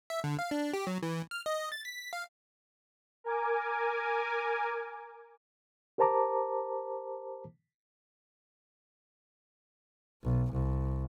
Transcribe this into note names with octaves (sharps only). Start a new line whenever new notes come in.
E5
D3
F5
D4
G4
F#3
E3
F6
D#5
A6
B6
F5
A#4 G#5 D6
G4 A#4 C5 A5 A#5 D6
B1
C2